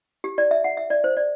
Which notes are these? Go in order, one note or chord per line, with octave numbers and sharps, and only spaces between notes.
G4
D5
E5
F#5
E5
D5
C5
D5